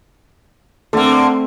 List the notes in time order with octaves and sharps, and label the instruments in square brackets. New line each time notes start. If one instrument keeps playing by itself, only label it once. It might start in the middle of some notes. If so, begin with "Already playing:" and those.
[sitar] D3 A#3 [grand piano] A3 C4